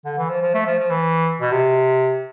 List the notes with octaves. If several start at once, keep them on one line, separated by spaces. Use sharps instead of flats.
D3
E3
F3
F3
A3
F3
F3
E3
B2
C3